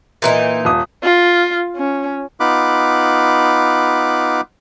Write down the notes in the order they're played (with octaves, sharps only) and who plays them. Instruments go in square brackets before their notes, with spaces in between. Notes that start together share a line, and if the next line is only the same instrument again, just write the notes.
[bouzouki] A#2 E3 D#4
[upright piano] D#1 D#6
[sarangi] F4
C#4
[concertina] B3 D#4 F4 B5 D6 F#6